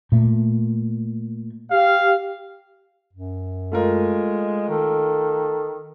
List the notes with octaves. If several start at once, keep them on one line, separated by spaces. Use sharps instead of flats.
A#2 A3
G4 F5
F#2
G#3 A3 F4 A#4
D#3 A4